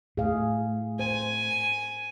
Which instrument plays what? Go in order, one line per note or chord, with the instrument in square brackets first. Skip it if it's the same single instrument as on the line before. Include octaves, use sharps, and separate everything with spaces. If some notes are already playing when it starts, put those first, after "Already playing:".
[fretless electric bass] A2 [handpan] G#4 F5
[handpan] C5 [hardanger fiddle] G#5